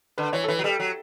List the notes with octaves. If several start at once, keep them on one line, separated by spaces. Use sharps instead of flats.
D3 B4
E3 C#5
A4
E3 B4
F#3
G3 A4
F#3